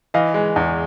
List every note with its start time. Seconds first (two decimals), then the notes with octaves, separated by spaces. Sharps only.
0.14 E3 D#5 F5
0.34 G#3
0.56 E2